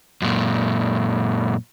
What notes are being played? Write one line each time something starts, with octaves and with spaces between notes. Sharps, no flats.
F#2 A#2